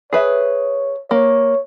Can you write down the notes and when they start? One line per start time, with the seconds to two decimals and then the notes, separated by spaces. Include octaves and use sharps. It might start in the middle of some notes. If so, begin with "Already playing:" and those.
0.13 G#4 B4 C#5 E5
1.11 A#3 C#5